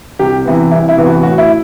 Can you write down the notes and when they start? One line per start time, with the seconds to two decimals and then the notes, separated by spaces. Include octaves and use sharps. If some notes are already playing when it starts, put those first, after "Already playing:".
0.19 C2 G4
0.45 C3 E3 B3
0.71 C2 E4
0.89 E4
0.98 C3 E3 B3
1.06 F#4
1.23 A2 F#4
1.38 E4